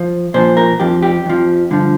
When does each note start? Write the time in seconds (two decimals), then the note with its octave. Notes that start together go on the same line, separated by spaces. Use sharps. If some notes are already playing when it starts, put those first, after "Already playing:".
Already playing: F3
0.34 A#2 F3 C5
0.57 A#4
0.80 F2 F3 G4
1.02 G4
1.26 F2 F3
1.71 G2 D3 F3